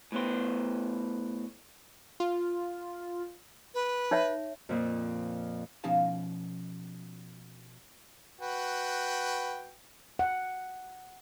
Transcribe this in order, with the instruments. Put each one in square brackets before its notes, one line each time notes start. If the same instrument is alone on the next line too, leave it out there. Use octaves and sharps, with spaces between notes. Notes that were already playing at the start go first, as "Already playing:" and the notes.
[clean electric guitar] A2 B3 C5
[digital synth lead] F4
[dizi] B4
[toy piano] D#4 C#5 E5
[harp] F2 A#2 F3
[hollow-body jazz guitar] B2 F3 C#4 D#4 F5 A5
[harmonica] F#4 B4 G5
[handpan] F#5